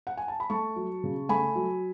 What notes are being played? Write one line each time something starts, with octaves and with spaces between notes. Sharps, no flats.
F#5
G#5
A5
B5
A3 A5 C#6
F#3
C#3
A3 G#5 B5
F#3